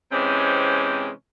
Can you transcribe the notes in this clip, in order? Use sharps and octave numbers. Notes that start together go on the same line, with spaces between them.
C3 E3 G#3 C4 C#4